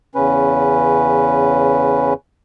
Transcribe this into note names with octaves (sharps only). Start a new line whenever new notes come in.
E2 C#3 C#4 B4